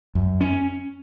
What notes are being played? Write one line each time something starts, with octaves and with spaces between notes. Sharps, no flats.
F#2
C#4